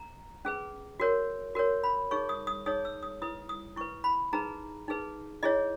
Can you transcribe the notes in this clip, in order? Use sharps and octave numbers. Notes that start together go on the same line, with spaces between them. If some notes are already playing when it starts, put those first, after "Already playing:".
Already playing: A#5
C#4 G#4 B4
F#4 A#4 C#5
F#4 A#4 C#5
B5
D#4 G#4 C#5 C#6
D#6
D#6
D#4 G#4 C#5 D#6
E6
D#6
E4 B4 D#6
D#6
E4 B4 C#6
B5
D#4 G#4 B4 A#5
D#4 G#4 B4
E4 G#4 C#5 D#5